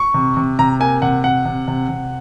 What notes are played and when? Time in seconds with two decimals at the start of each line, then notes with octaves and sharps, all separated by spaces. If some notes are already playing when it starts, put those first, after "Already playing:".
Already playing: C#6
0.14 C3
0.37 C3
0.59 C3 A#5
0.80 A#3 G#5
1.02 C3 F#5
1.24 C3 F#5
1.45 C3
1.68 C3
1.88 C3